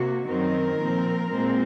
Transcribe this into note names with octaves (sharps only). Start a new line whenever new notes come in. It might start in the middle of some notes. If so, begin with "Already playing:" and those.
Already playing: C3 A#3 F#4
F#2 D#3 F#3 C4 A#4
A#2 F3 C4
A#2 G#3 C4